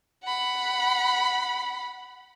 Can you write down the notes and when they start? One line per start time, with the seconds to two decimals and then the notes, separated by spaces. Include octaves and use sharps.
0.24 F#5 B5